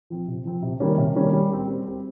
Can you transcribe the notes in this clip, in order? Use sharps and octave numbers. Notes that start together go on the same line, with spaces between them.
F3 C4
C3
F3 C4
C3
D#3 G3 A#3 C#4
C3
D#3 G3 A#3 C#4
G3
C4 G4
G3
C4 G4